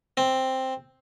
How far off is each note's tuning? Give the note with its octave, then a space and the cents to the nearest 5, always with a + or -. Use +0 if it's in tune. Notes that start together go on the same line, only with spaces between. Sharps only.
C4 +5